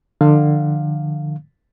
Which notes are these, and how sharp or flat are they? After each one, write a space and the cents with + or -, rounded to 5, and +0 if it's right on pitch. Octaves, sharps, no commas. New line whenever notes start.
D3 +30 F3 +0 F5 +0